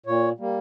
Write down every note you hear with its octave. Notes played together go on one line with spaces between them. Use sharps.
A#2 C#5
G3 A#3